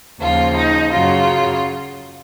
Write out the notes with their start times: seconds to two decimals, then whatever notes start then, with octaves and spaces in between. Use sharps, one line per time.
0.20 D#2 C#3 F3 F4
0.56 D#4
0.92 F#2 C#3 F#3 F4